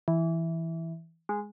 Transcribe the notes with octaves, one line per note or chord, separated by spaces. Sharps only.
E3
G#3